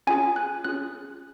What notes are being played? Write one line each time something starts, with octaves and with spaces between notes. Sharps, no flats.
C#4 F4 G#4 G#5
F#6
C#4 F4 G#4 F#6